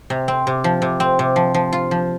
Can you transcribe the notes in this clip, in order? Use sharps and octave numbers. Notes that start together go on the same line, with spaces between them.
C3
C4
C3
F3
C3
C4
C3
F3
F3
F4
F3